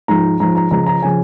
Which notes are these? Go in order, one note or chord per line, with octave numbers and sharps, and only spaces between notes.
G#2 F3 A#5
G#2 F3 A#5
A#5
C#2 C#3 F3 A#5
A#5
C#3 F3 G#5